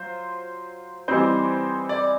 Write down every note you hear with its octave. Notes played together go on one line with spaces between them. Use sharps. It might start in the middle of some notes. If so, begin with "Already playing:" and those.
Already playing: F#3 F4 C5
E3 G3 C4 D#4 C5
D5